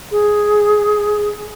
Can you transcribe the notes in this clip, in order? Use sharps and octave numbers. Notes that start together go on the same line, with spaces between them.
G#4